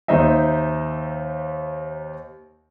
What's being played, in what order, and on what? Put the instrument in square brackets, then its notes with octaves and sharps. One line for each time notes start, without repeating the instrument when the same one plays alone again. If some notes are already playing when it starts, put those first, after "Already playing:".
[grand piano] D#2 D#4 C5 D#5 E5